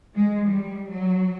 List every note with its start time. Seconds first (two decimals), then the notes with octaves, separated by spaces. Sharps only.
0.15 G#3
0.46 G3
0.89 F#3